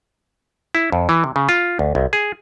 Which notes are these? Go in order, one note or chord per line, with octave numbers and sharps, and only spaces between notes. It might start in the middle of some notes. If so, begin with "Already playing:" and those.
E4
F2
E3
C3
C#3
F4
D2
C2
G#4